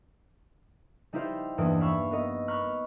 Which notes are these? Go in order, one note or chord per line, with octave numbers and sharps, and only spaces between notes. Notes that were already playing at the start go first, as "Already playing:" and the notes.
G3 D#4 E4 G4 C5 F5
E2 G2 E3 A#3 D#6 D7
E5 F5 B5 C#6 E6
B3 A#4 D#5
A#5 B5 C#6 F6 F#6